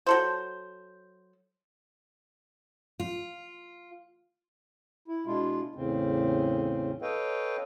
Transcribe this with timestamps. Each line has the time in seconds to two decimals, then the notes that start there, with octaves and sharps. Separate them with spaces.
0.06 F#3 A4 C5
3.00 F4
5.08 E4
5.26 B2 G#3 D4 E4 F4
5.75 E2 A2 C#3 C4
7.02 A4 B4 C#5 D#5 F5 G5